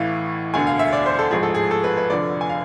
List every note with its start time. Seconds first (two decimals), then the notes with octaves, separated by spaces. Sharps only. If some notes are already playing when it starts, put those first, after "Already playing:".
Already playing: A1 A2 E3 F5
0.53 E1 D2 D3 G#5
0.67 F5
0.79 E5
0.93 D5
1.06 C5
1.19 A4
1.31 A1 G#2 F3 G#4
1.43 A4
1.55 G#4
1.71 A4
1.84 B4
1.97 B4
2.10 F1 F2 D3 D5
2.41 G#5
2.49 F5